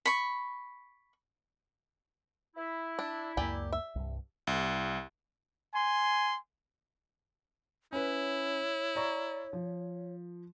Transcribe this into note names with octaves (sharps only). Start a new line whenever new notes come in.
B5 C#6
E4
D4
C#2 F#2 A#3 G4 D5 G#5
E5
C2 G2
C2
G#5 C6
C#4 E4 B4 C#5
D5 A#5 C#6
F3